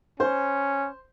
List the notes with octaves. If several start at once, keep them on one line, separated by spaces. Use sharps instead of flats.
C#4 C5 G6